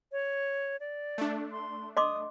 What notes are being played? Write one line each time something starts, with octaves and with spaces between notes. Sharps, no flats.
C#5
D5
A3 D4
C6
D#5 C6 D6 D#6